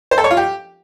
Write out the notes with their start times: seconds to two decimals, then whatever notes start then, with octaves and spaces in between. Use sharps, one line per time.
0.11 C5
0.18 A4
0.24 C#5
0.31 F4
0.37 G4